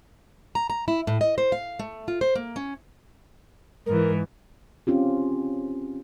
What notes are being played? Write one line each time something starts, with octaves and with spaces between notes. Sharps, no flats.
A#5
A#5
E4
A2
D#5
C5
F5
A3
F4
C5
A#3
C#4
G#2 E3 A#4
C4 C#4 F4 G4